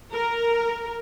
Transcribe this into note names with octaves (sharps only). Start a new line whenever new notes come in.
A#4